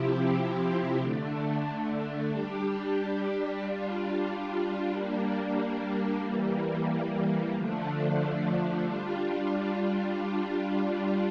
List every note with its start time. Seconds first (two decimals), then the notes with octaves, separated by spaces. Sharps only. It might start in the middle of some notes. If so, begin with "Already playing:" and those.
Already playing: C3 F3 C4 E4 G4
0.98 D3 A3 D4
2.29 G3 D4 G4
3.60 G3 D4 F4
4.91 G3 A#3 D4
6.22 E3 G3 A#3
7.53 D3 F3 A3 D4
8.83 G3 D4 F4